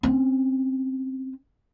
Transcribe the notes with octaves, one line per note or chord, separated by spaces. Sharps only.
C4 C#4